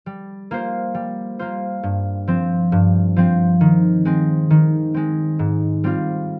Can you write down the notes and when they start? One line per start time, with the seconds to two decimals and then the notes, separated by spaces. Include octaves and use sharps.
0.06 G3
0.51 A#3 F4 C5
0.94 G3
1.39 A#3 F4 C5
1.83 G2
2.27 F3 C4
2.72 G2
3.16 F3 C4
3.61 D#3
4.05 G#3 C4
4.50 D#3
4.94 G#3 C4
5.39 G#2
5.84 G3 C4 F4